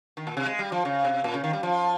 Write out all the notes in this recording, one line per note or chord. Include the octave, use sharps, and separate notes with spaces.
D#3
A#2
C3
G#3
G3
F3
C#3
C3
A#2
C#3
D#3
G3
F3